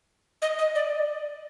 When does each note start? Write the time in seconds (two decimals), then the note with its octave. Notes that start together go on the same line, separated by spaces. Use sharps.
0.42 D#5
0.59 D#5
0.75 D5